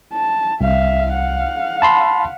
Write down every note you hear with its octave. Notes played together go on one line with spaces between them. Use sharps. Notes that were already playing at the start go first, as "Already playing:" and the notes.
A5
C2 E5 F5
F5 F#5
A5 B5 C6